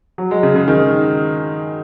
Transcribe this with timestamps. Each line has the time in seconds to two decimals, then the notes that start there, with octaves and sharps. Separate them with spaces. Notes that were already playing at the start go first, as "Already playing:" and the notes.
0.18 F#3
0.31 G#3
0.43 C#3
0.56 C#3
0.68 D#3